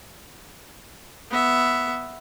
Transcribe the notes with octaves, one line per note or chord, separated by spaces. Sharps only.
B3 E5